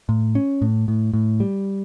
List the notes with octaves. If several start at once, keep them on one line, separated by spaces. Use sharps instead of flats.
A2
C#4
A2
A2
A2
G3